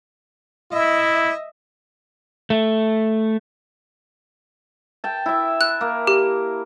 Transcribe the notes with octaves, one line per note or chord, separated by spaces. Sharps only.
E4 D#5 E5
A3
G5 A5
E4 E5
F#6
A#3
G4